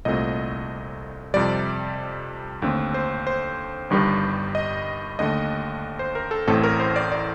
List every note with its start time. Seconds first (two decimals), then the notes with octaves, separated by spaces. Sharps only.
0.05 C2 A#2 A3 C4 D#5
1.34 F2 C3 G3 D5
2.62 D#2 D3 A3 C4
2.94 C5
3.27 C5
3.90 G1 G2 D#3 G3
4.55 D#5
5.19 D#2 D3 A3 D#5
5.99 C5
6.15 A#4
6.31 A4
6.47 A1 A2 A3 C4 A4
6.63 A#4
6.80 C5
6.96 D5
7.12 D5